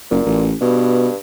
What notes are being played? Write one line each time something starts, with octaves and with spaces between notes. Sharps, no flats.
F#1 A#2
A1
G2 B2